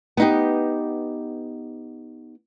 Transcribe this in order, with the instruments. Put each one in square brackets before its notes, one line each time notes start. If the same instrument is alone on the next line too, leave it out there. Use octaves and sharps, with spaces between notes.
[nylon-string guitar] B3 D#4 G4